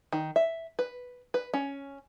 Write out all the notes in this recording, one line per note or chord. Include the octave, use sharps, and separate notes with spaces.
D#3
E5
B4
B4
C#4